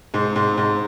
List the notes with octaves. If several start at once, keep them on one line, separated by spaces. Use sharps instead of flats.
G#2
G#2
G#2